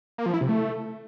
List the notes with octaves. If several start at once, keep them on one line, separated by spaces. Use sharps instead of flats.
A#3
F3
E4
C3
A3